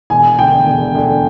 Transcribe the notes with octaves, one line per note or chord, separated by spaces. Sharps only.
E1 G#5
D2 D3 G5
E1
D2 D3